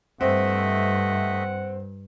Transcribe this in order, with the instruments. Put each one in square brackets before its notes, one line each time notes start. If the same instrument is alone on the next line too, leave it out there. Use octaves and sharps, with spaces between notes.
[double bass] G2 [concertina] A3 D#5 E5 [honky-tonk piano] C4 [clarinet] F#5